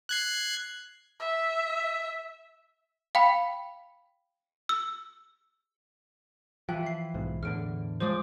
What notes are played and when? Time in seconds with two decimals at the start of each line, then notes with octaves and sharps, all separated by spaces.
0.09 F#6 G#6 C7
1.20 E5
3.15 F5 G5 B5
4.69 E6
6.69 E3 F3 G5 F#6
6.83 E5 C7
7.14 B1 G#2
7.43 E2 A2 D3 F6 D7
8.00 F3 G#3 C5 D5 D#6